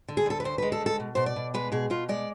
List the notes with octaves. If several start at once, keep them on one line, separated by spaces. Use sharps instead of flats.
D3
G#4
D2 A4
B4
D2 C5
G#3 B4
A4
D2
A4
B2
B2 C5
D5
B2
G#3 B4
B2 G#4
B2 F4
G#3 D5